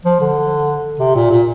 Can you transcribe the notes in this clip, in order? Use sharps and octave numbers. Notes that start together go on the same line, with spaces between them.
F3
D3
C3
A#2
A#2